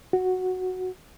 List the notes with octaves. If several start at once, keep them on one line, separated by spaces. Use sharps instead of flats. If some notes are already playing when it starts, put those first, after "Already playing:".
F#4